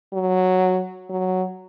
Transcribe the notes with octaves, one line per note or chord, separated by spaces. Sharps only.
F#3
F#3